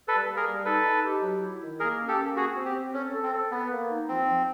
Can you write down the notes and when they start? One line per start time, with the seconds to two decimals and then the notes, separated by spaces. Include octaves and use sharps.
0.08 G3 A4 B4
0.27 A#3
0.36 G#4 A#4
0.46 G3
0.65 D#4 A4 B4
0.84 D#4
1.04 G4
1.22 F#3
1.41 E4
1.61 D#3
1.80 A#3 G#4 A#4
1.99 C#4
2.08 G4 A4
2.18 A#3
2.36 C4 F#4 G#4
2.56 C4
2.65 G4
2.75 C4
2.93 C#4 A4
3.13 A4
3.23 C4
3.32 A4
3.51 B3 B4
3.70 A#3
3.89 D#4
4.08 F3 C4
4.27 F3